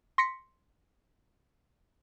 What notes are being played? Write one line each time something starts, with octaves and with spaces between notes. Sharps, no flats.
C6 A#6 B6 C#7